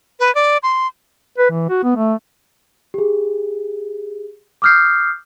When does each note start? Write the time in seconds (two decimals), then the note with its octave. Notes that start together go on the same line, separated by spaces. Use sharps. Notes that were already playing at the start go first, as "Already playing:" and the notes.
0.20 B4
0.35 D5
0.63 C6
1.38 B4
1.51 E3
1.69 F#4
1.83 B3
1.96 A3
2.94 G4 G#4
4.62 D6 D#6 F6 G6 C7